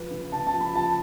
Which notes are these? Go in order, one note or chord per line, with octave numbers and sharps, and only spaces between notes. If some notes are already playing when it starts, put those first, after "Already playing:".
Already playing: F3 B4
C#3
C#3 A5
A5
F3
B5
F3 A5